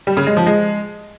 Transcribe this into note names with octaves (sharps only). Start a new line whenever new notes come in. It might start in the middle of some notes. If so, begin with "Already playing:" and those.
G3
C#3
G#3
F3
G#3